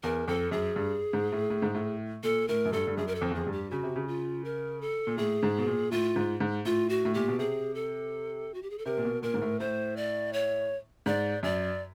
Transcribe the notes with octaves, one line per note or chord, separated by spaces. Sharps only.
E2 A#4
F2 A4
F#2 G#4
G2
G#2
A2
A2
G#2
A2
A#2 A4
A2 A#4
F#2
G2 A4
G2
F#2 G#4
A#4
A4
F2
E2
F2 G#4
G2
G4
C#3 F#4
C3
C#3
F4
A#4
A4
A#2
A2 G#4
G#2
B2
A#2
A2 F4
G#2
G#2
A2 F4
F#4
A2
A#2 G4
B2
C3 G#4
A4
F#4
G4
G#4
A4
C3 A#4
A#2
B2
A#2 A#4
G#2
A2
A2 C5
D5
C#5
G#2 D5
F#2 D5